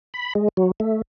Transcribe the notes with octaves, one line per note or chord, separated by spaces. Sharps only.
B5
G#3
F#3
A3